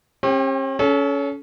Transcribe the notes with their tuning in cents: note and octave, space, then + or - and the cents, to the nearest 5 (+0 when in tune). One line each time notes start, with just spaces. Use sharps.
C#4 -45 G4 +30 G5 +0
C#4 +20 A4 -25